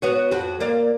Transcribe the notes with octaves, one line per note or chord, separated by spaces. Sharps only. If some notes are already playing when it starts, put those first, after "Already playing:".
B3 F#4 C#5
F2 F#4
A#3 D5 F5